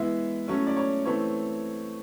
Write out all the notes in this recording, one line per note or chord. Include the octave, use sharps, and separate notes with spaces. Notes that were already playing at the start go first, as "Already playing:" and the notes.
Already playing: E3 G#3 B3 E4 E5
F#3 A3 C#4 E4
D5
C#5
E3 A3 C4 C#5